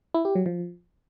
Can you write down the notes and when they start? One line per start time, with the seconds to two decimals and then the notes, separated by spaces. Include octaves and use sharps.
0.14 E4
0.25 G4
0.35 F#3
0.46 F3